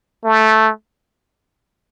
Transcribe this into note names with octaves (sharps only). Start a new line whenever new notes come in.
A3